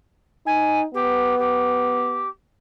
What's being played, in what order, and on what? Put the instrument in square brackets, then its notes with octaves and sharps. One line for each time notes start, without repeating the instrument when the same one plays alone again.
[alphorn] D#4 [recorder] G#5
[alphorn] B3 [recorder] G4
[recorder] G4